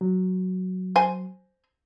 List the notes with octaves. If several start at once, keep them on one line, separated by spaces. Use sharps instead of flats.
F#3
C5 G#5